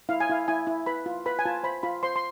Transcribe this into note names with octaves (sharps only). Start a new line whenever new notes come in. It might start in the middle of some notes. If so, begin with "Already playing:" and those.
E4 F5
G#5
E4 F5
E4 G#5
E4
B4 B5
F4
B4 B5
G#5
F4 A5
C5 B5
F4 B5
C5 C6
C6